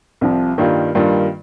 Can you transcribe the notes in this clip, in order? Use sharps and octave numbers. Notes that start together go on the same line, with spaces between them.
C2 C3 F3
G2 D#3 G3 A#3 F4
G2 D#3 G3 A#3 F4